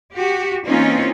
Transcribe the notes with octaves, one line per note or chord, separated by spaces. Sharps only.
F#4 G4
E3 A#3 C4 C#4 D#4 F4